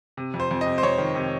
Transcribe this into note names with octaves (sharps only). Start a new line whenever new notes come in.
C3
F2
C5
F2
D#5
C3
C5
F2 C#5
D#3
C3